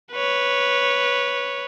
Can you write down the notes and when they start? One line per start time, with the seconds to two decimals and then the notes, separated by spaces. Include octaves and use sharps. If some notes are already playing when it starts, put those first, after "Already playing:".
0.12 B4 C#5